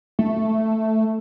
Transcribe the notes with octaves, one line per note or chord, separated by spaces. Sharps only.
A3